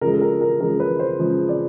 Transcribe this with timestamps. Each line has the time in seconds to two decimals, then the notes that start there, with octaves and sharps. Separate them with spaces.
0.01 C#3 F3 G#3 A#4
0.13 A4
0.21 A#4
0.41 A#4
0.60 C#3 F3 G#3 A#4
0.80 B4
0.99 C5
1.19 C#3 F3 G#3
1.48 D5